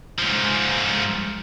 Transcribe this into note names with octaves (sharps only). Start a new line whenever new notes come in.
G#2 F3